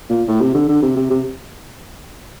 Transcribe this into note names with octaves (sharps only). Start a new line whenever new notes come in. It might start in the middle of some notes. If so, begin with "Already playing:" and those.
A#2
A2
C3
D3
D3
C3
C3
C3